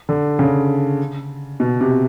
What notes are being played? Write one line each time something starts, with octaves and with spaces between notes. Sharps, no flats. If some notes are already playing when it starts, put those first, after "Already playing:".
D3
C#3
B2
C3